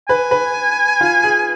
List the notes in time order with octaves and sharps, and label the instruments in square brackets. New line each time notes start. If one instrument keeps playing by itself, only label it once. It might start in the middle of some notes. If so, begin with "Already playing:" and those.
[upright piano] B4 [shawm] G#5
[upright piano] B4
F4
G#4